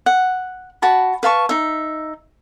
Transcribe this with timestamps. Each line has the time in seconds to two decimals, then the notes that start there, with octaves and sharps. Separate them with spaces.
0.06 F#5
0.82 F#4 A5 B5
1.23 B4 F5 A5 C#6
1.49 D#4 E5